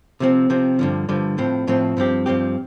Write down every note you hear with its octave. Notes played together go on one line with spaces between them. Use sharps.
C3 F3 C4
C3 F3 C4
G2 D3 F3
G2 D3 F3
A2 F3 C4
A2 F3 C4
G2 F3 C4 G4
G2 F3 C4 G4